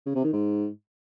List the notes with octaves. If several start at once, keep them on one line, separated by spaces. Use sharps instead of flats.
C#3
C3
D#3
G#2